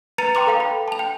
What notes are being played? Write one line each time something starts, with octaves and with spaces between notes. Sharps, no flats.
B4 A#5 A6 C#7 D#7 F7
G5 A#5 C6 D6 F7
A4 F5 G5
B5
A5 F7
G5